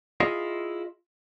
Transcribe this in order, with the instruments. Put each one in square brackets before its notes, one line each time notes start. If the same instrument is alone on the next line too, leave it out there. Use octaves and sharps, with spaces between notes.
[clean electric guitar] E4 F4 G#4 D#5 F5